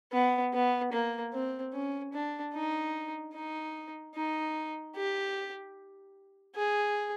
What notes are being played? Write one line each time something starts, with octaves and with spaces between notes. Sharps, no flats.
B3
B3
A#3
C4
C#4
D4
D#4
D#4
D#4
G4
G#4